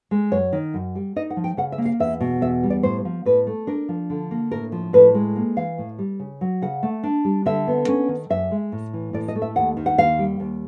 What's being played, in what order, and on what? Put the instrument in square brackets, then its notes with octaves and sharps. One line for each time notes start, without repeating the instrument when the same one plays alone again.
[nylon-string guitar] G#3
F#2 C#5
D#3
F#2
G3
D#4 D#5
F#5
F3
G5
C#3 F#5
E5
A#3
F5
E2 E5
B2
E2 E5
G3
D5
A2 C5
F3
A2 B4
A3
D4 A#4
F3
D3
A#3
A2 A#4
F3
A2 B4
G#3
A#3
E3 F5
A2
G3
C#3
F#3
C#3 F#5
A3
D4
G3
D3 E5
B3
C#4
D#3
F#2 E5
G#3
A2
E3
A2 D5
D#5
A3
E5
D#2 F#5
D#3
F#5
D#2 F5
G3
D#2